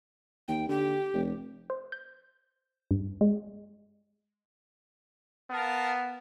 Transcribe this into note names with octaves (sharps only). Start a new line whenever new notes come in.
D#2 G5
D3 G4
F1
C5
G6
G2
G#3
B3 A#4 F5 A5